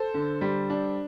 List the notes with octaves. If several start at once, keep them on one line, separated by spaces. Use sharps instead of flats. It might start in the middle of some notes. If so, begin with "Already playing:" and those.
Already playing: A4 C5
D3
G3
D4